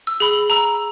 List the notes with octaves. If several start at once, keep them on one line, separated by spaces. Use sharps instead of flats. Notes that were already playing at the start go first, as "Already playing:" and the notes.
E6
G#4 B5
A#5 E6